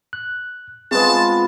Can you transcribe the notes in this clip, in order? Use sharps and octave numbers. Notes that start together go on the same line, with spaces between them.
F#6
G#3 B3 C4 F4 G#4 B4 A5